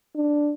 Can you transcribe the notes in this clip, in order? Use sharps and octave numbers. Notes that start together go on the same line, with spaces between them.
D4